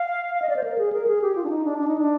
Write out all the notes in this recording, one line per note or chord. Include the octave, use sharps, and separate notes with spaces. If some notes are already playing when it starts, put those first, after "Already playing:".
Already playing: F5
F5
D#5
D5
C5
A#4
G#4
A#4
G#4
G4
F4
D4
D#4
D4
D4
D#4
D4